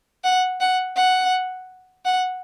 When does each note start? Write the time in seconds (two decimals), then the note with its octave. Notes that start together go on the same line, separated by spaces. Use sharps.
0.24 F#5
0.60 F#5
0.96 F#5
2.05 F#5